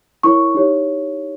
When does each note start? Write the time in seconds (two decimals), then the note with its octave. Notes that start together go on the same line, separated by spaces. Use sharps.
0.23 E4 A#4 C#5 C#6
0.55 D#4 G4 C#5